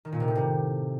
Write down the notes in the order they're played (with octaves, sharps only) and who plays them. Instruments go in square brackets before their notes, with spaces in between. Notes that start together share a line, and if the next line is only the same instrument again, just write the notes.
[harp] D#3
A#2
C3
A2
C3